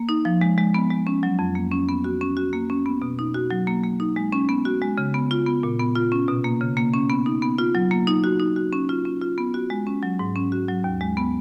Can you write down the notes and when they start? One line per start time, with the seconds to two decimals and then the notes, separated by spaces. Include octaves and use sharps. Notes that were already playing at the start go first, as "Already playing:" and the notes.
Already playing: A#3
0.09 D#4
0.25 F3
0.41 G#3
0.58 G#3
0.74 B3
0.90 G#3
1.07 C#4
1.23 F#3
1.39 F2
1.55 A#3
1.72 C#4
1.88 B3
2.04 F#4
2.21 C#4
2.37 F#4
2.53 A#3
2.70 C#4
2.86 B3
3.02 B2
3.19 D#4
3.34 F#4
3.51 F#3
3.67 A#3
3.83 A#3
4.00 D#4
4.16 G#3
4.32 C#4
4.49 B3
4.65 F#4
4.81 G#3
4.98 C#3
5.14 B3
5.31 F4
5.46 B3
5.63 A#2
5.79 B3
5.95 F4
6.12 C#4
6.28 B2
6.44 A#3
6.61 C#3
6.77 A#3
6.94 C#4
7.10 B3
7.26 D#4
7.42 B3
7.58 F4
7.75 F#3
7.91 A#3
8.07 D#4
8.24 F#4
8.40 D#4
8.56 F#4
8.73 C#4
8.89 F4
9.05 C#4
9.22 F4
9.38 B3
9.54 F#4
9.70 G#3
9.87 C#4
10.03 F#3
10.19 G#2
10.36 C#4
10.52 F#4
10.68 F#3
10.84 D#2
11.01 G#3
11.17 B3